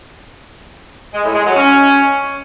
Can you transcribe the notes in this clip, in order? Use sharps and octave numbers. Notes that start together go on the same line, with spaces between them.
G#3
A2
G#3
F#3
C#4